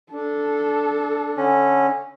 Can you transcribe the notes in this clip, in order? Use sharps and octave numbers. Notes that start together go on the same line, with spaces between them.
D4 A4
D3 C#4